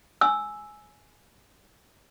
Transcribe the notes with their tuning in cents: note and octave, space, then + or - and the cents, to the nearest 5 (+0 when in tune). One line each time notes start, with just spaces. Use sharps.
G#5 +10 E6 +0